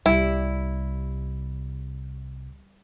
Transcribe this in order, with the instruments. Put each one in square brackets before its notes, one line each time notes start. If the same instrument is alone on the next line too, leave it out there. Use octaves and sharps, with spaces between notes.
[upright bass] C2 C3 [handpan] G3 [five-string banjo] E4